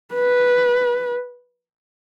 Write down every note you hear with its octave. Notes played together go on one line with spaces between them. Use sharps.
B4